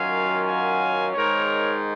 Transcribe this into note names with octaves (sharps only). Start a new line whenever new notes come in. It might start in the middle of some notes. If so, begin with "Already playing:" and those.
Already playing: F#2 D#3 F#3 C#4 F4 F5 G#5
F5 G#5
G#2 D#3 G#3 A#4 C#5